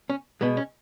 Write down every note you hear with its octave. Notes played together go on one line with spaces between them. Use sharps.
C#4
B2 G#3 B3
C#4